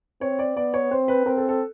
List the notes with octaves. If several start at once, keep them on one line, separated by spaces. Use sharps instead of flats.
C4 C#5
D5
B3 D5
C#5
C4 C5
B4
C4 A#4
A4
A4